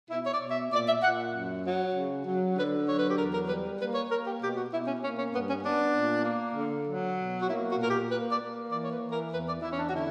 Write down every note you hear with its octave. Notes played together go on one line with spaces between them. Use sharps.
B2 E4
C#5
D5
B2
E5
A#2 D5
E5
A#2 F#5
F#2
F#3
C#3
F#3
D3 B4
F#3 C#5
B4
G4
E2 A#4
A#4
G3 B4
A#3 B4
C#5
A#3 A#4
G4
B2 G4
F#4
B2 E4
C#4
A#3 C#4
C#4
G2 B3
C#4
B3 D4
A#2
A#3
D3
F#3
B2
F#4
A#3 E4
F#4
A#2 A#4
G4
A#3 B4
D5
A#3
E3 D5
C#5
B4
E3
A#4
E2 B4
D5
E2 E4
C#4
D4
F#4
D3 E4